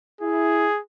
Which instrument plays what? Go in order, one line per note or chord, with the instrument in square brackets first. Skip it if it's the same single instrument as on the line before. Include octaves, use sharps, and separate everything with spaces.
[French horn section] E4 [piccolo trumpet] G#4